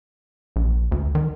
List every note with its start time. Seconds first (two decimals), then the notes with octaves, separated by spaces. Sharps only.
0.56 A#1
0.92 D2
1.15 D#3